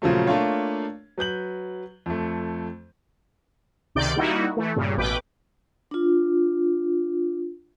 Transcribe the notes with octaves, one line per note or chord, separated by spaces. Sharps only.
A#2 C#3 F3 F#3 A3
A3 A#3 D4 F4 C#5 F5
F#3 B4 G6 F#7
F2 A3
C#2 C3 D#3 D5 G6 D7
G3 A#3 D#4 E4 F#4
E3 A3
G2 A#2 C#3
A1 B2 B4 G5 D6
D4 F4